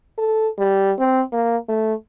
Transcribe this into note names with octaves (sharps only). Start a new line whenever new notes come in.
A4
G3
C4
A#3
A3